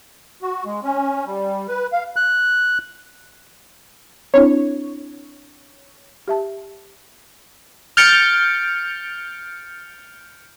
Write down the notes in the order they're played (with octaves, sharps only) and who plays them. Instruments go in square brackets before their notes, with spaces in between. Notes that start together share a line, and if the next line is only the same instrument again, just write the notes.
[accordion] F#4
G#3
C#4
G3
B4
F5
[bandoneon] F#6
[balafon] C4 D4 E4 [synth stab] C#5
[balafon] G4 E5 A5
[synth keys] F6 G6 A6 C#7 D7